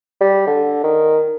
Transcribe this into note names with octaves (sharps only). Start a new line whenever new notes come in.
G3
D3
D#3